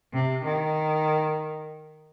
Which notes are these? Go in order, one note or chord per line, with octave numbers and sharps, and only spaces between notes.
C3
D#3